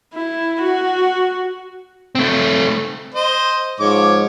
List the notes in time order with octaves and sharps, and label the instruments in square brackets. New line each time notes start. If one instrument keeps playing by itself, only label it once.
[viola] E4
F#4
[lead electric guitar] A3 C4
[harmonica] C5 D#5
[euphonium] G#2 [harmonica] F3 C#5 D6